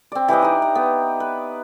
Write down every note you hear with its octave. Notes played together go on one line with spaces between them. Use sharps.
C4 D5
E3 G4 B4 D#5
D#4 D5
A#5
B3
B4